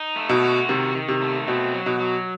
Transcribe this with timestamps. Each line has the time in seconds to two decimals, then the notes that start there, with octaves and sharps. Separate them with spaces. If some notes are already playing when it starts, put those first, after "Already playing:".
Already playing: D#4
0.16 A3
0.29 B2
0.42 F#4
0.68 C3 D#3
0.95 D#3
1.08 C3
1.22 A3
1.47 B2 C4
1.74 F#3
1.86 B2
2.00 F#3